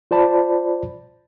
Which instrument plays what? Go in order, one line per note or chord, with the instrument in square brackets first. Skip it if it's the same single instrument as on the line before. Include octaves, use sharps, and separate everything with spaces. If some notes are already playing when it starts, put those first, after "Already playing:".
[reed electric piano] F4 C5 D5 A5 B5